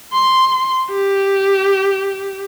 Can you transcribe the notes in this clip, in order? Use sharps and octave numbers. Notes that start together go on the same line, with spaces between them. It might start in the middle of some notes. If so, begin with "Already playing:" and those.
C6
G4